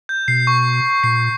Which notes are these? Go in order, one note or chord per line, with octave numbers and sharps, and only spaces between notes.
G6
B2 C7
C#6
A#2 C7